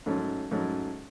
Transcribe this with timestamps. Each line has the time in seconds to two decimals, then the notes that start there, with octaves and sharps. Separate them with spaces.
0.06 G#2 F#3 A3 C#4
0.51 G#2 F#3 A3 C#4